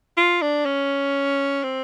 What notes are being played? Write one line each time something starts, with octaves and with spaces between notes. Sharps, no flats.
F4
D4
C#4
C4